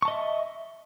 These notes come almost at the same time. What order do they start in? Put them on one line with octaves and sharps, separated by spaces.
C#6 A5 D#5 E5